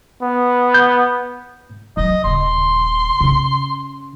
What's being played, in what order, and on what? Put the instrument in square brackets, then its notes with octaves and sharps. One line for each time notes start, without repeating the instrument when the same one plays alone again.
[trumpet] B3
[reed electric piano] G6
[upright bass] F3 F#3 [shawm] D#5
[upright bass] D#1 C#3 [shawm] C6
[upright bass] C#3 C#4